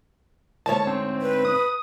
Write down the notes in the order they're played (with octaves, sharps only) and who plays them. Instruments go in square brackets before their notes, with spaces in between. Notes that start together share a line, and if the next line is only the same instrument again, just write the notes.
[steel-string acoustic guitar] D2 G#2 C#5 [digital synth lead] A5
[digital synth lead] C4
[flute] B4
[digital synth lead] D#6